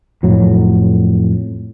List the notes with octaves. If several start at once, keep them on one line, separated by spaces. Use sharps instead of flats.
F2 A2 F#3